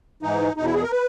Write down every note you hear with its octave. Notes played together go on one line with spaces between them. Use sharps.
G#2 E3 D#4
E2 B2 D#4
E4
G#4
A#4
B4